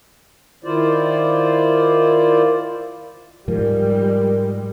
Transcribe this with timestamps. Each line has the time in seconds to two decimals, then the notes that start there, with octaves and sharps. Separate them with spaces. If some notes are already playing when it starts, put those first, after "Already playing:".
0.64 D#3 E4 F4 C5 D5
3.48 G#2 F3 G3 G#3 A#4